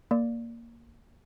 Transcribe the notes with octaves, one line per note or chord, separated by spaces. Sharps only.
A#3 D5